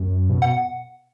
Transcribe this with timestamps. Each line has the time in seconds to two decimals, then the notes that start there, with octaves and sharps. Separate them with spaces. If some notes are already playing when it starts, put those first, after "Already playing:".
Already playing: F#2
0.29 B2
0.42 F#5